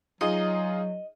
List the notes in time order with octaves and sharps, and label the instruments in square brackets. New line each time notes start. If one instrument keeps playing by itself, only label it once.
[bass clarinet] F#3 [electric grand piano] D#4 F4 G#4 [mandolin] D#5